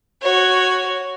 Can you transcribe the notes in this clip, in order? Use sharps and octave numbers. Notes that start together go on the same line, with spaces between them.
F#4 C#5